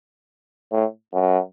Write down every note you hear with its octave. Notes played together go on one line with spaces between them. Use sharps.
A2
F#2